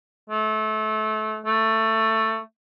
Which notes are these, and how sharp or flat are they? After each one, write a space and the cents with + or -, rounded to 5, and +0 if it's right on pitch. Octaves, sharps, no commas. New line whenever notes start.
A3 -25
A3 +15